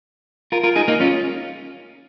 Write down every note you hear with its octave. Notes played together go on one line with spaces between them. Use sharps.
F4 A#4
F4 A#4
D#4 G#4
A#3 D#4
C#4 F4